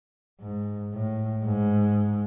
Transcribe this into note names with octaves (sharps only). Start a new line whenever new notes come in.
G#2
A2
G#2